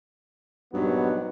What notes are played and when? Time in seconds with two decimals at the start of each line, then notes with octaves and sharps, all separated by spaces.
0.74 A#1 G2 F#3 B3 D#4